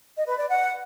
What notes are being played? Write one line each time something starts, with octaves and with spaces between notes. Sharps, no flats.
D#5
B4
D5
F#5